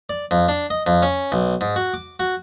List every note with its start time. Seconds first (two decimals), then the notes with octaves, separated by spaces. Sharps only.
0.09 D5
0.31 F2
0.48 D4
0.70 D#5
0.87 F2
1.02 C#4
1.32 B1
1.61 G#2
1.76 F#4
1.94 D6
2.20 F#4